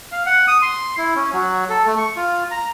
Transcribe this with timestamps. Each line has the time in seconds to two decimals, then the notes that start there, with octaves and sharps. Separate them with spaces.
0.12 F5
0.26 F#5
0.48 D#6
0.62 C6
0.98 E4
1.15 C#4
1.33 F#3
1.69 A4
1.86 A3
1.98 C#6
2.16 F4
2.51 A#5